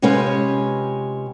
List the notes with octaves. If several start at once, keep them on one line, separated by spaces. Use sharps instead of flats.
C3 G#3 C#4 F4 G4 B4